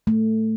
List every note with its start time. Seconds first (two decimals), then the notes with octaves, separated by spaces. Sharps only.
0.07 A3